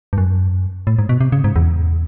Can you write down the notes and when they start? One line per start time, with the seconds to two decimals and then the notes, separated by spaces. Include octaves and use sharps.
0.13 G2
0.18 F#2
0.87 A2
0.99 G#2
1.09 B2
1.21 C3
1.32 C#3
1.44 G#2
1.56 E2